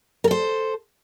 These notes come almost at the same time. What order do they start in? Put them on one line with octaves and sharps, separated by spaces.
A#4 A4 C5